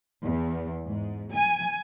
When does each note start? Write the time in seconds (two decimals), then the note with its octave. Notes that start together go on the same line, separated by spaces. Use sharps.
0.25 E2
0.86 G#2
1.34 G#5